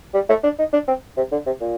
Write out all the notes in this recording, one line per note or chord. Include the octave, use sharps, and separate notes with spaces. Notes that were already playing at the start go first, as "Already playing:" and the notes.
G3
A3
D4
D#4
D4
C4
C3
D3
C3
A#2